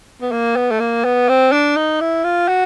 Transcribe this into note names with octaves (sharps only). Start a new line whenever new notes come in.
B3
A#3
B3
A3
A#3
B3
C4
D4
D#4
E4
F4
F#4